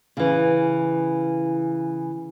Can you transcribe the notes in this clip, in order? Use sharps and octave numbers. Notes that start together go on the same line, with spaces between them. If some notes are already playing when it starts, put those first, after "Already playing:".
C#3 E3